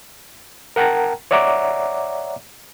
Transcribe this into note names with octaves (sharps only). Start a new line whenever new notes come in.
A#4 F#5 G5 A5 A#5
C#5 D5 E5 F#5 A#5 D6